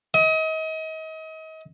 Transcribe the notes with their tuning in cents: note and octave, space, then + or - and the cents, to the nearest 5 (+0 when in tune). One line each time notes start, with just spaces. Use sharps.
D#5 +35